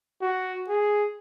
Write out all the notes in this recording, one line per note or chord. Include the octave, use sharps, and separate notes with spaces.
F#4
G#4